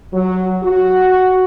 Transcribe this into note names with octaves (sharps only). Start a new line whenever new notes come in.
F#3
F#4